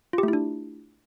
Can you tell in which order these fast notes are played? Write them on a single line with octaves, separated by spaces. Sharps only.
F4 G4 A3 E4 D4